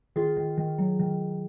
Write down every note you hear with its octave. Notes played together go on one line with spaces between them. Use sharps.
D#3 F4 G#4
D#3
D#3
F#3
D#3